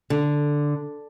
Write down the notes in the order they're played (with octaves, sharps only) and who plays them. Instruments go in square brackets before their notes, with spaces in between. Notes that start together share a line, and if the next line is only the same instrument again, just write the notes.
[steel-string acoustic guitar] D3